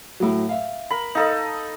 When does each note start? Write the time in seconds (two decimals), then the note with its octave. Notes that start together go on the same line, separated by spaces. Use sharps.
0.20 A2 F#3
0.49 E5 F5
0.91 A#4 B5
1.15 D#4 A4 D#5 F5